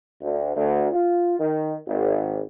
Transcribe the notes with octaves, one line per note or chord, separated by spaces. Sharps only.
D2
D2
F4
D#3
G#1